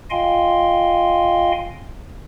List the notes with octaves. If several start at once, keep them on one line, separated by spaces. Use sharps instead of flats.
F4 D#5 F5 G5 G#5 C6